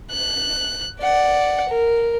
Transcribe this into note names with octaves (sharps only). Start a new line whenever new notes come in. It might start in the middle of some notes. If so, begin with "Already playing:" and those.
F#6
D5 F#5
A#4